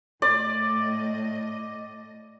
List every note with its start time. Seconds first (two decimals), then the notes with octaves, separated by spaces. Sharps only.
0.22 A2 D5 D#5